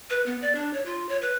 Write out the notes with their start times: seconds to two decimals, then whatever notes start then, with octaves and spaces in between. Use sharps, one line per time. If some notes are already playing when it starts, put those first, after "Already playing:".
0.10 B4
0.26 B3
0.42 D5
0.55 D4
0.73 C#5
0.86 F4
1.09 C#5
1.22 B4